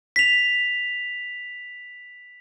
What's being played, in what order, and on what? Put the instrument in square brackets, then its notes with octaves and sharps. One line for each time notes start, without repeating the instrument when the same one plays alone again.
[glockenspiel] B6 F7